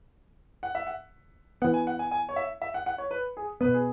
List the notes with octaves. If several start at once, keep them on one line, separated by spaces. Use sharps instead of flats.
F#5
E5
F#5
E3 B3 F#5
G#5
F#5
G#5
G#5
C#5
E5
E5
F#5
F#5
C#5
B4
G#4
B2 B3 B4
G#4